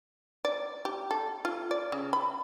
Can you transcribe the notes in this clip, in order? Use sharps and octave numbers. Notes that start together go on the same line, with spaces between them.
D5
G4
A4
F4
D5
C#3
B5